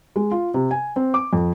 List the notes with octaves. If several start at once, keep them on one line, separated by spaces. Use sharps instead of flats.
G#3
F4
C3
G#5
C4
D6
F2